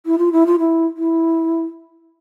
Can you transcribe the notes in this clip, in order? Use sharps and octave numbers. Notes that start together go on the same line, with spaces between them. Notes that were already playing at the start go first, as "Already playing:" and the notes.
E4
F4
E4
F4
E4
E4